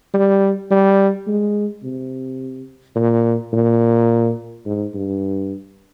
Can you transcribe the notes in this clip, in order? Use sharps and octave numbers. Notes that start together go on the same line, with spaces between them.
G3
G3
G#3
C3
A#2
A#2
G#2
G2